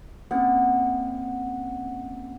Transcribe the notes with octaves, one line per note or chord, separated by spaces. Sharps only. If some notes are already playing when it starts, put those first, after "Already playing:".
A#3 C4 C#4 F#5